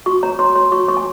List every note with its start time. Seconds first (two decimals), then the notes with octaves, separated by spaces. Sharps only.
0.06 F#4 C#6
0.23 C#5 A#5
0.39 C#5 C6
0.56 C#5 C6
0.72 F#4 C#6
0.88 C#5 C#6
0.97 G#5